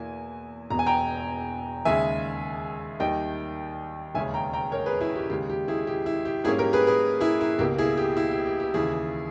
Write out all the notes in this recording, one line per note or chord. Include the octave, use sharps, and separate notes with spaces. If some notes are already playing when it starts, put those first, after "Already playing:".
Already playing: E2 B2 A#3 E4 G#5
E1 E2 B2 A#5
G#5
G5 A#5
D#2 C#3 G#3 E5 G#5
D#2 D#3 G3 D#5 G5
E1 D#2 C#3 G#3 C#4 E5 G#5
G5 A#5
G5 A#5
A#4 C#5
G#4 B4
E4 G#4
G4
D#2 C#3 G#3 G4
G4
E4 G#4
G4
E4
G4
G#2 G3 A#3 C#4 E4 G#4
G4 A#4
G#4 B4
G#4 B4
E4 G#4
E4
C#2 B2 A#3 G4
E4 G#4
G4
E4
G4
G4
G4
D#2 C#3 E3 E4 G#4